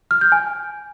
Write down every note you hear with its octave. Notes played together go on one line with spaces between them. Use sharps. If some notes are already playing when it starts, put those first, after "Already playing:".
F6
G6
G#5